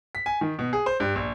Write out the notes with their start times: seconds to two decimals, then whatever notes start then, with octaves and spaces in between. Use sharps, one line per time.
0.15 B6
0.26 G#5
0.41 D#3
0.59 B2
0.73 G#4
0.86 C5
1.00 G2
1.15 A#1